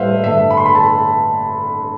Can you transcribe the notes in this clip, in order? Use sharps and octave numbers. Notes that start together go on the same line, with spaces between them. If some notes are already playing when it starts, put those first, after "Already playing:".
Already playing: A2 G3 B4 C5 E5 F5
G2 D3 A3 E5
B5
C6
B5
A5